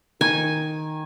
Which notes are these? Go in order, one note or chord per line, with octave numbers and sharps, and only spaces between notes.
D#3 G#5